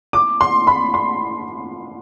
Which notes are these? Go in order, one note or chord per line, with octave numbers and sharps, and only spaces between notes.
D6
C6
B5
C6